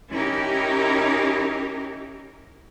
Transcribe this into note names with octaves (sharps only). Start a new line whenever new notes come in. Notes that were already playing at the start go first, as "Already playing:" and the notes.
C#4 D#4 E4 G4 A#4